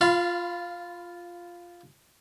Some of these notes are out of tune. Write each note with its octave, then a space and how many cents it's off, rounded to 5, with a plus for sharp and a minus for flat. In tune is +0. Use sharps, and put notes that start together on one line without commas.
F4 +0 F5 -25 B5 +20